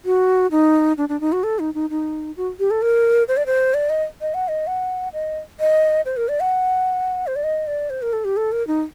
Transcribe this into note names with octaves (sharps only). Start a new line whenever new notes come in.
F#4
D#4
D4
D4
D#4
F#4
A4
D#4
D#4
D#4
F#4
G4
A4
A#4
C5
D5
C5
D5
D#5
D#5
F#5
D#5
F#5
D#5
D#5
C5
A#4
D5
F#5
C5
D5
D#5
D5
C5
A#4
A4
G4
A4
A#4
D#4